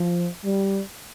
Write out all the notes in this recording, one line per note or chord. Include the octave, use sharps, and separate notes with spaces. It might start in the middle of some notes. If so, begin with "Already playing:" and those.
Already playing: F3
G3